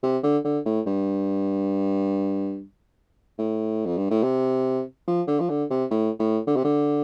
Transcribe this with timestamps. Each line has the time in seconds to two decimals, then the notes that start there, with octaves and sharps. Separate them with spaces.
0.03 C3
0.23 D3
0.44 D3
0.66 A2
0.86 G2
3.39 A2
3.85 F2
3.97 G2
4.10 A2
4.23 C3
5.07 F3
5.27 D3
5.40 F3
5.49 D3
5.70 C3
5.91 A2
6.19 A2
6.47 D3
6.56 C3
6.64 D3